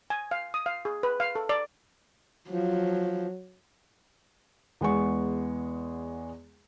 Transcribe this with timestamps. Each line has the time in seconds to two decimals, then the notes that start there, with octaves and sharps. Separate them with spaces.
0.10 G#5
0.31 F5
0.54 D#6
0.66 F5
0.85 G#4
1.03 B4
1.20 F5
1.35 A4
1.49 D5
2.50 F3 F#3
4.81 E2 G#3 B3 C#6